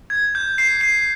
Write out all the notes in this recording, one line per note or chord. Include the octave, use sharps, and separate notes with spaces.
G#6
G6
C7
C7